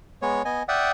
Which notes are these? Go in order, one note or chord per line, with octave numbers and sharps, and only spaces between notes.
G#3 B3 C#5
B3 D#5 G#5
D5 E5 F#5 G5 D#6